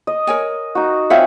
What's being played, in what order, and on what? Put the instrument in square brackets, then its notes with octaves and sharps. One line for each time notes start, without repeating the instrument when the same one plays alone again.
[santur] D#5
[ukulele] A#4 C#5 G#5
[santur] D#4 F#4
[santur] C4 F4 G#5 [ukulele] C#5 E5 F#5